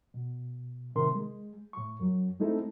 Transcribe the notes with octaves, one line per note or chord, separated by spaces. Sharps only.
B2
A2 C3 D#3 A#4 C6
G#3
A2 C#6
F#2 F#3
G#3 A3 C4 D#4 E4 A4